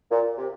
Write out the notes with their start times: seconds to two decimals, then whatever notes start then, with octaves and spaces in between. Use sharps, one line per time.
0.11 A#2
0.38 C3